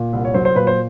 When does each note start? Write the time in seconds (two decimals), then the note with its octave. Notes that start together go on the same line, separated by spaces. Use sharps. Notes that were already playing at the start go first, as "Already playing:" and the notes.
Already playing: A#2
0.13 C2
0.25 C#5
0.34 F#3 C5
0.45 C5
0.55 A#2 B4
0.67 C5